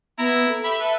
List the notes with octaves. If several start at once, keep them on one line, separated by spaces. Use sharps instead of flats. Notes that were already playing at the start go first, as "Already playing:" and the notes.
B3 E4 A#5
A4
G4 E5 B5
A4 B4 E5